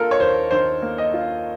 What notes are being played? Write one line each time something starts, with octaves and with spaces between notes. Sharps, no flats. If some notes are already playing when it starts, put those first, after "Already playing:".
Already playing: A#3 F4 A4 A#4
C#5
D#2 C5
D#3 C5
A#3
D#5
F4